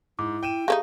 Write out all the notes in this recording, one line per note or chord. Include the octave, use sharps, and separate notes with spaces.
G#2 E4 D6
G5 D#7 E7
A3 C4 D#4 G4 G#4 F5